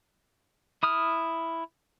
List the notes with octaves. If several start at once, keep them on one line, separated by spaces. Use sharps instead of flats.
E4 D#6 F6